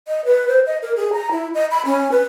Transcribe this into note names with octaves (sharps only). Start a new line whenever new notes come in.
D#5
B4
C5
D#5
A#4
G#4
A#5
E4
D#5
B5
C#4
B4